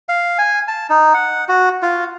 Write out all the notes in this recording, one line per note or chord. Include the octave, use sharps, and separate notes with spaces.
F5
G#5
A5
D#4
F#5
F#4
F4